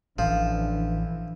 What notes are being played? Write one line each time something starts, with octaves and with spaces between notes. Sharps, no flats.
A1 E3 F3 D4